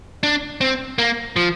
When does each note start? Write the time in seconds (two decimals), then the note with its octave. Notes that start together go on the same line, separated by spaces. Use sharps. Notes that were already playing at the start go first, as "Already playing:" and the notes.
0.23 D4
0.61 C4
0.98 A#3
1.36 F3